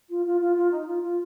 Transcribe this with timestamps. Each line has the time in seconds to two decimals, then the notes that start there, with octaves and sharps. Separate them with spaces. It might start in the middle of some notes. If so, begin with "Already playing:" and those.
0.09 F4
0.26 F4
0.40 F4
0.56 F4
0.71 D#4
0.87 F4
1.02 F4